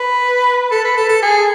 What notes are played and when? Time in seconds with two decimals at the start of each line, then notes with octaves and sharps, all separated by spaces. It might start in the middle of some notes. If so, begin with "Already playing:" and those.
Already playing: B4
0.72 A4
0.85 B4
0.97 A4
1.09 A4
1.22 G#4